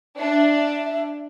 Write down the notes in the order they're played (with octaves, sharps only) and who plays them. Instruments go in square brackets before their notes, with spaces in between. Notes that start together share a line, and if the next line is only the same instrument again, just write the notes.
[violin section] D4 [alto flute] E5